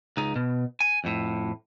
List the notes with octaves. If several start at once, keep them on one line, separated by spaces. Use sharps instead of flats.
C#2 D#4
B2
G#5
F2 A2